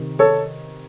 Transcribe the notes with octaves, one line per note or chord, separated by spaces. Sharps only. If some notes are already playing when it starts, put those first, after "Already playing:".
Already playing: C3 D#3
A4 C#5